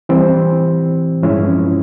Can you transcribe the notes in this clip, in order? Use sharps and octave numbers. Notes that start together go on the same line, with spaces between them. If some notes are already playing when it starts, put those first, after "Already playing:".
E3 G3 C4
G2 F3 G#3 C#4 E4